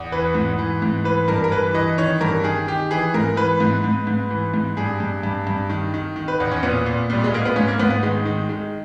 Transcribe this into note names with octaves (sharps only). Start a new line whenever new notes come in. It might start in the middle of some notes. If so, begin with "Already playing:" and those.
Already playing: E2
E3 B4
G#2
E3
G#2
E3 B4
G2 A#4
A#4
E3 B4
E3 D#5
D#3 C#5
G2 A#4
D#3 G#4
D#3 G4
E3 G#4
G#2 A#4
E3 B4
G#2
G#2
G#2
E3
G#2
G2 G#4
G2
G2
G2
D#3
D#3
D#3
B4
E2
C#4
A#2 B3
A#2
A#2 G3
G#3
A#2 A#3
B3
G#2 C#4
A#3
G#2 B3
B3
D#3 G#3
D#3
D#3 G#3